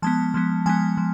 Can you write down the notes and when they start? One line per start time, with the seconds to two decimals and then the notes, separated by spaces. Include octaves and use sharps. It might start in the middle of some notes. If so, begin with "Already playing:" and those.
0.02 F3 G#3 B3 A5
0.34 F3 G#3 B3
0.66 F3 G#3 B3 G#5
0.97 F3